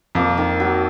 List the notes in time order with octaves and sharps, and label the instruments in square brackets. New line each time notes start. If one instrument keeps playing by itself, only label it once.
[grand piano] F2 [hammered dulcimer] A#3
[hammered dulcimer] D#3
F#3